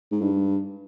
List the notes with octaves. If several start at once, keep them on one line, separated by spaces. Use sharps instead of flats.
G#2
G2